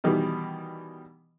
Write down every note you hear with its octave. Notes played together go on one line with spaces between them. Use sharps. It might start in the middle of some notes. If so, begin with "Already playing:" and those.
B2 D#3 E3 G3